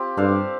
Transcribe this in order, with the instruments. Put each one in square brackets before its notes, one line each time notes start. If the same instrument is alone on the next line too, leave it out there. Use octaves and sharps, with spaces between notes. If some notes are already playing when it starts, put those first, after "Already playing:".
Already playing: [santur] C4 F4 G4
[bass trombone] G2 [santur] D4 A4 C5 F5